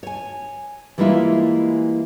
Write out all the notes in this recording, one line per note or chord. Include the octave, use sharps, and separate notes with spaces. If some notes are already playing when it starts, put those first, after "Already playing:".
C#5 G#5
E3 G3 G#3 A#3 E4 F4